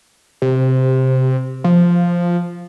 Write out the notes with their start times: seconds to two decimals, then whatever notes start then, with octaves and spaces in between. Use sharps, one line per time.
0.42 C3
1.64 F3